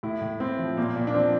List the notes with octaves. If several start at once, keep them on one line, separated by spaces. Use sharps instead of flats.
A2 E4
A2
A2 C4
F3
A#2 A#3
A#2
D4
F3 C4